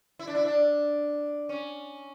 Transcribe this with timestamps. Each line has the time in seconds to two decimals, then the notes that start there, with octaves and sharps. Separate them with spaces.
0.19 E4
0.27 D4
0.35 E4
0.45 D4
1.49 C#4